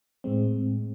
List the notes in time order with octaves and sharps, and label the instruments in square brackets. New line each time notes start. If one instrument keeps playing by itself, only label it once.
[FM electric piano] A2 G#3 C4